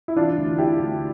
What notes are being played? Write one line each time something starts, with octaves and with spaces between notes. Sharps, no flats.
E4
E3 D4 F4
D2
C3 E4 G4
D2